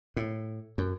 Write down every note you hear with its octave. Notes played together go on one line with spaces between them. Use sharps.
A2
F#2